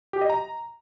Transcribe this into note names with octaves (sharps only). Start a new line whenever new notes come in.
G4
D#5
A#5